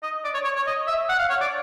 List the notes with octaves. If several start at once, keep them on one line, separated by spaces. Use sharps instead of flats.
D#5
D5
C#5
C#5
C#5
D#5
E5
F#5
F5
C#5
D5